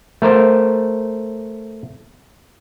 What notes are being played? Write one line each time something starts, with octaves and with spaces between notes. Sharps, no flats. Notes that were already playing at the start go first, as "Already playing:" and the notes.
A3 A#4 C5